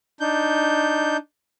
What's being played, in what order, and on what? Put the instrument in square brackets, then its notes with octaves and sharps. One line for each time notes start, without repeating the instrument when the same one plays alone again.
[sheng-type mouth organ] D4 D#4 G6